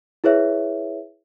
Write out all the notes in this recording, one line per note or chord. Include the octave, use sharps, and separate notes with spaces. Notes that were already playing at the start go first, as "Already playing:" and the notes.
E4 G#4 B4 C#5 E5